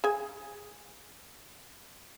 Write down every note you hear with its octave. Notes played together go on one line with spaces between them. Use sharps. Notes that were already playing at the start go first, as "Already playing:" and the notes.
G#4 G#5